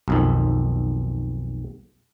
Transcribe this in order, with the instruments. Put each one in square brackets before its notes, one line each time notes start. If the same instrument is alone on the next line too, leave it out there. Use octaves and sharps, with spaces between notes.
[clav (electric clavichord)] B1 F2 D#3